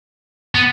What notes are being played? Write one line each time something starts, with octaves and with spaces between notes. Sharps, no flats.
B3